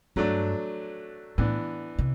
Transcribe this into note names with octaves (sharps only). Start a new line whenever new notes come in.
G2 F#3 A3 D4
A2 E3 B3 D4
C3